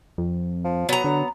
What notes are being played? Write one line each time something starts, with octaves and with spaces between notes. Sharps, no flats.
F2
F3
F#3 B3 A#5
D3 F#3